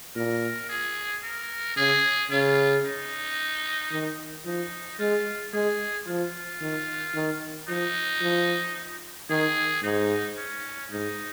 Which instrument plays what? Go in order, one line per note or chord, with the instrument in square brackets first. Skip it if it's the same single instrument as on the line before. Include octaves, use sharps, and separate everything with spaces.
[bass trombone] A#2 [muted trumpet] A#4
[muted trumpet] G#4
A#4
[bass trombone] C#3 [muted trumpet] G#4
[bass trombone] C#3 [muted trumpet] F4
[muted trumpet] D#4
[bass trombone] D#3
[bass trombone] F3 [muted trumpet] D#4
[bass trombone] G#3 [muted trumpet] F4
[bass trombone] G#3 [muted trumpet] G#4
[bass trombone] F3 [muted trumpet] F4
[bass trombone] D#3
D#3
[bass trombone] F3 [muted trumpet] D#4
[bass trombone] F3
[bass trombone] D#3 [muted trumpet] G#4
[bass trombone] G#2 [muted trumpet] D#4
[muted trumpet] C#4
[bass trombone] G#2 [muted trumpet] D#4